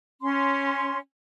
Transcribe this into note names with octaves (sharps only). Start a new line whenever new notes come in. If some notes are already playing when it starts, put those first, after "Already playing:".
C#4 C6